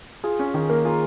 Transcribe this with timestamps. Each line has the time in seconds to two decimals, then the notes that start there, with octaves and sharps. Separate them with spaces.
0.24 F4 G#4
0.39 C#4
0.54 D#3
0.70 A#3 A#4
0.85 F4 G#4